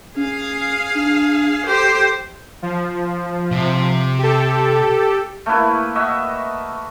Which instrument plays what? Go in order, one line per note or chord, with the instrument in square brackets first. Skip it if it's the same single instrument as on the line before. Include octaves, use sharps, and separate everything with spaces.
[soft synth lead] C#4 [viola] G#4 F5
[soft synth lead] D4
[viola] G4 C5 [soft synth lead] A4
[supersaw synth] F3
[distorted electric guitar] C3
[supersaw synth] G4 A4
[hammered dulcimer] A3 A#3 E4 B4
F#4 D#5 E5